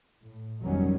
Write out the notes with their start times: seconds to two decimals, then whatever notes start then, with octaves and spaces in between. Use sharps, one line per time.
0.22 A2
0.62 F1 B2 D#3 F#3 G3 C#4